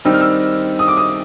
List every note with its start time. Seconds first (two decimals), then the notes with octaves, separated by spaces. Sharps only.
0.05 D#3 G3 C4 D#4 E6
0.13 F6
0.21 E6
0.79 D#6
0.88 D6
0.97 D#6